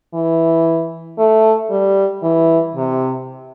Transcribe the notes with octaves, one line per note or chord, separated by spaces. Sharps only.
E3
A3
G3
E3
C3